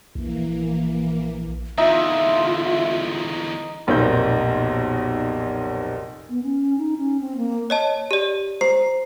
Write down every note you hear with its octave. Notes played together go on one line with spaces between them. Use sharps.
A#1 E3 A#3
E2 D3 D#4 F4 E5
F1 B1 A#2 C4 D#4 G6
B3
C#4
D#4
C#4
C4
A#3
C#5 D#5 A5
G4 D5
C5 A#5 C7